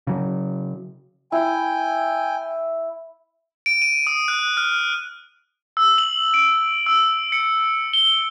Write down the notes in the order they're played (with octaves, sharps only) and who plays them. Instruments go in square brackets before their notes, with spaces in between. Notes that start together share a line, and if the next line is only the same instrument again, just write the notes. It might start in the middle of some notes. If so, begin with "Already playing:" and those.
[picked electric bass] C#3 F#3
[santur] E4 [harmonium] G5 G#5
[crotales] D7
D#7
D#6
F#6
F6
E6
F#7
D7
E6
C#7
G7